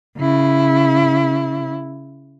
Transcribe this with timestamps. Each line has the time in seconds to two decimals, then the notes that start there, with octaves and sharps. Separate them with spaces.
0.18 C#3 E4